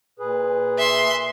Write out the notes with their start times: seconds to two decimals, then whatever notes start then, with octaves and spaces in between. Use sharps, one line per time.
0.19 A#2 G#4 B4
0.78 E5 C6